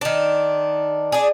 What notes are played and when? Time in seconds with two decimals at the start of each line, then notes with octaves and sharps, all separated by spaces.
0.01 D#3 D4
1.12 D4 G#4